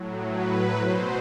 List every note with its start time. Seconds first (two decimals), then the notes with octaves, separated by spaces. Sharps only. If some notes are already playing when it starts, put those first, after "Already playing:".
Already playing: A2 F#3
0.30 B4
0.77 B2 F#3 C5